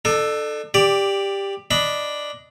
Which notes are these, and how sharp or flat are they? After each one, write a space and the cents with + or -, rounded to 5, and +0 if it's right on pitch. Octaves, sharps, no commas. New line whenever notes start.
D4 +40 A4 +0
G4 +10 D5 +0
D4 +0 D#5 +0 B5 +0